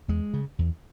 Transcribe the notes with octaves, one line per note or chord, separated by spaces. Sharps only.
E2 G#3
C#3
E2